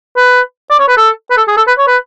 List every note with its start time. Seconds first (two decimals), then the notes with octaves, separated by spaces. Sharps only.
0.17 B4
0.70 D5
0.79 C#5
0.88 B4
0.97 A4
1.30 B4
1.37 A4
1.48 G#4
1.57 A4
1.68 B4
1.78 C#5
1.87 B4